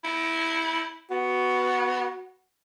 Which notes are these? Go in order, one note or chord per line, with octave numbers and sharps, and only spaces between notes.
E4
B3 F#4